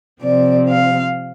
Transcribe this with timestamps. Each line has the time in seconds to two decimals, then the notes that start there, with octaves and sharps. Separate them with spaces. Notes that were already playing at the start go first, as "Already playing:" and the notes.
0.22 C3 F3 C4 D5
0.69 F5